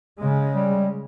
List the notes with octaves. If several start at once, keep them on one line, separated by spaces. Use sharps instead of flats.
C#3 G#3
G3